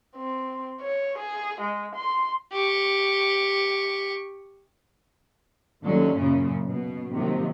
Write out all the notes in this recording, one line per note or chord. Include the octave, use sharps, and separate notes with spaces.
C4
C#5
G#4
G#3
C6
G4 C#6
D#2 D3 F#3 C#4
F#2 A#2 C#3
B2
C3 D#3 F3 F#3 A#3